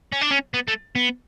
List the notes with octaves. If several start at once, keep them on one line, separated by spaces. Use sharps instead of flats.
C#4
D4
C#4
B3
A3
B3